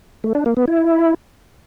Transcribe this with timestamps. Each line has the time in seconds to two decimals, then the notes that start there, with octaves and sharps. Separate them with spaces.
0.24 A3
0.35 D4
0.46 A#3
0.57 B3
0.68 E4